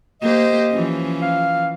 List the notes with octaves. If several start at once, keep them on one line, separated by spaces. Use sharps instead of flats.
A#3 G4 C5 D#5
E3 F3 C#4
F5